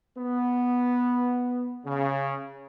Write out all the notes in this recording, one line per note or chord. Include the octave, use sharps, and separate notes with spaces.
B3
C#3